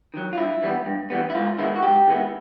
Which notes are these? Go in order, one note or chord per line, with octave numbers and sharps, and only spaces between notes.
D#3 F#3
F4
G2 E4
E3 G3 B3
G2
E3 G3 B3
E4
G#2 F4
D#3 G#3 B3 E4
F#4
G#2 G4
D#3 G#3 B3 E4